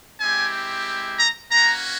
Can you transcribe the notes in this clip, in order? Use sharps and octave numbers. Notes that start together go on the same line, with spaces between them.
G#3 C4 E4 G4 G#5
A#5
A#3 C#4 F#4 A#5